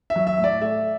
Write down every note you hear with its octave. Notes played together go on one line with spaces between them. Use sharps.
E5
F#3
E5
A2
D5
A3 E5